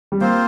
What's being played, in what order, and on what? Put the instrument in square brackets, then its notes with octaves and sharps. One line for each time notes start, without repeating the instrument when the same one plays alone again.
[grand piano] G3
[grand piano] A#3 [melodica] C4 F4 C5